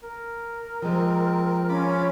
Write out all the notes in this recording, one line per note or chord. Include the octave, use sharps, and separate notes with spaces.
A#4
F3 G#3 C4
C#4 F4 B5 D6